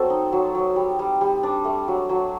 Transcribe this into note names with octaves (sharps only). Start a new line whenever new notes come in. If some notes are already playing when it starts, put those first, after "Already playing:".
Already playing: F#3 C4 A4
D#4
F#3
F#3
G3
G3
G3
D4
A3
F#3
F#3